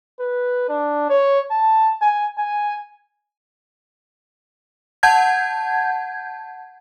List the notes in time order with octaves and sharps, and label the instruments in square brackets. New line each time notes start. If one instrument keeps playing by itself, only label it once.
[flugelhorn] B4
D4
C#5
A5
G#5
G#5
[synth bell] F#5 A5 G6 G#6